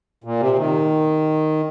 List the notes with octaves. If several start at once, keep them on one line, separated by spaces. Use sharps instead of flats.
A#2
C3
D#3